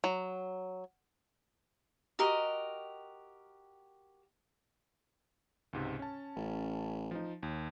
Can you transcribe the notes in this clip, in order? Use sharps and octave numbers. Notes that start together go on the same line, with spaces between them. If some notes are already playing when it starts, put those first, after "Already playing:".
F#3
F#4 G4 A#4 D#5
C#2 G#2 C3
C#4 A5
A1
F3 D#4
D#2